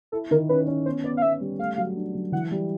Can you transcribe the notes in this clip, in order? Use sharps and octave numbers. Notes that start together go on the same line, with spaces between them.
E4 A4
D#3 A#4
C#4 B4
C#4
B3 C5
B3 D5
F5
B3 E5
G3
A3 F5
F#3
D4
F#3
E3 F#5
G3